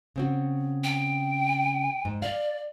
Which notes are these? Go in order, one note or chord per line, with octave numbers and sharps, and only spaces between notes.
C#3 C4 F#4
G5
G#2
D5 F5